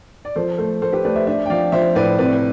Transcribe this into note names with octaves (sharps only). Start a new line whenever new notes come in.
D5
F3 A4 C5
A3 A4 C5
A3 A4 C5
G4 B4
A3 B4 D5
C5 E5
D4 C5 E5
G5
F3 D5 F5
F3 C5 E5
A2 B4 D5
C3 B4 D5